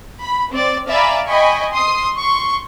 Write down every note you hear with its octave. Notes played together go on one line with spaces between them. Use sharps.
B5
C4 D5
D5 E5 F5 G#5 A#5 B5
D#5 G5 G#5 B5 C#6
C6 D#6 C7
C6 C#6